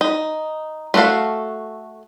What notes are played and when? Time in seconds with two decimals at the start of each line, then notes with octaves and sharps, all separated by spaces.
0.01 D#4
0.94 A3 F4 F#4 A4 F5